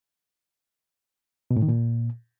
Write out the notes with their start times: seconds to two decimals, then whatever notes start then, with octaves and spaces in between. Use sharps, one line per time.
1.51 B2
1.57 A2
1.62 D#3
1.68 A#2